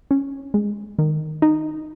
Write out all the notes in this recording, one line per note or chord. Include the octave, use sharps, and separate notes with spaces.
C#4
G#3
D#3
D#4